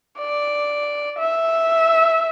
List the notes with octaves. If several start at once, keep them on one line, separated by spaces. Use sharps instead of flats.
D5
E5